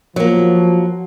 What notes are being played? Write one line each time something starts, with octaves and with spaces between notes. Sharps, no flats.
F3 F#3 A#3